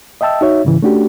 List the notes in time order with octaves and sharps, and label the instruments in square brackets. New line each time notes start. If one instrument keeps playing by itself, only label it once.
[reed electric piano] D#5 E5 G5 A5 E6
D#4 F#4 C#5 E5
G#2 C#3 E3
A3 C#4 D4 F#4 G4